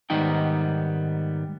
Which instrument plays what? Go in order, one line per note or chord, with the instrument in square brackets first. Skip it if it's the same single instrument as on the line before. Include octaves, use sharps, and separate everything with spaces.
[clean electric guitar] G#2 D#3 G3 B3 D#4 G5